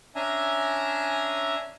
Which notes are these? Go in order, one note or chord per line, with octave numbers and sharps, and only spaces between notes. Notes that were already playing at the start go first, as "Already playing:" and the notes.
C#4 D4 E5 G#5 A#5